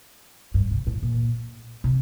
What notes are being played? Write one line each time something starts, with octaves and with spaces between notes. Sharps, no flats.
G2
C3
A2
A#2
C3